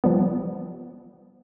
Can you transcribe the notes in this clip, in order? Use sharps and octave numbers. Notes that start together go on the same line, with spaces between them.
F3 G3 B3